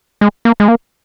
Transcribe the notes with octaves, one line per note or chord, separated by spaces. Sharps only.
G#3
A#3
G#3
A#3